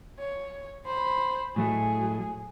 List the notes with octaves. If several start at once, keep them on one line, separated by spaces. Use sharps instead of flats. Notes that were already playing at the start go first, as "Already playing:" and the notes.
C#5
C5 B5
A2 F#3 A3 G#4